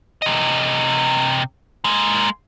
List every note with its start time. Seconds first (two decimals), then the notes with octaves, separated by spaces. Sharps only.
0.22 C3 D#5
1.85 G#3 A#3